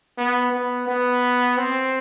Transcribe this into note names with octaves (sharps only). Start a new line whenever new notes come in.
B3
B3
B3
C4